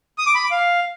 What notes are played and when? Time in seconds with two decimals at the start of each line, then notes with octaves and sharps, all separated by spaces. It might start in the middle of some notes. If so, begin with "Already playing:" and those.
0.18 D#6
0.27 D6
0.35 B5
0.43 D6
0.51 F5